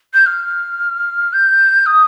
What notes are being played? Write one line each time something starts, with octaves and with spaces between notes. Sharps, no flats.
G6
F6
G6
D#6